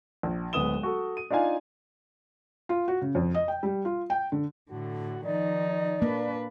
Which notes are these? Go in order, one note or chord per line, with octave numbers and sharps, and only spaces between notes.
A#1
D1 G#3 B3 D#6 E7 G7
F#4 A4
D#7
D4 D#4 F4 F5 G#5
F4
F#4
C#3
F2
D#5
G5
G3
F4
G5
D3
A2 D3 F#4
D#3 F3 D#4 D5
A#3 D4 B4